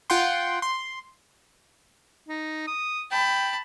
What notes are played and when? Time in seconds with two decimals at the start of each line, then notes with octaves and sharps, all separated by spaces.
0.10 F4 F#5 G5 C6
0.62 C6
2.28 D#4
2.67 D#6
3.12 G5 A5 B5